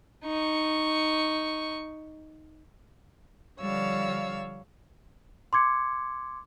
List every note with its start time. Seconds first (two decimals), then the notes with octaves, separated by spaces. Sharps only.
0.25 D#4 C#6
3.58 D3 F3 G3 C#5 F5 E6
5.53 C6 D6 G#6 C#7